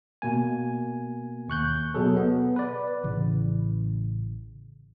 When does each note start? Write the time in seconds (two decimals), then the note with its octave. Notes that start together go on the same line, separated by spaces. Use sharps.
0.22 B2 A#3 G#5
1.48 D#2 C#6 F#6 G6
1.94 B2 F#3 G#4 A4
2.17 B3
2.56 B4 D5
3.04 A1 C#3 E3